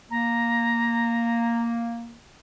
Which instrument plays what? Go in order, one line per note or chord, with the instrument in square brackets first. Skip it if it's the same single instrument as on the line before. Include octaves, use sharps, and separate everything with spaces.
[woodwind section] A#3 [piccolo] A#5